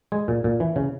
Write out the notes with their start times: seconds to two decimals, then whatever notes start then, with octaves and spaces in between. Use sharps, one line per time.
0.12 G#3 G#5
0.28 A#2
0.44 A#2
0.60 E3
0.76 C#3